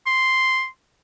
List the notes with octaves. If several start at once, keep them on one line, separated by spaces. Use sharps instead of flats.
C6